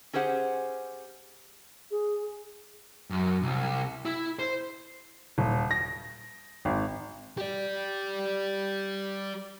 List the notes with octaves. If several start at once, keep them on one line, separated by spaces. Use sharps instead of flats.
C#4 G4 G#4 C5 F#5
G#4
F#2
C2
E4
C5
D#1
A#6
G#1
G4 D5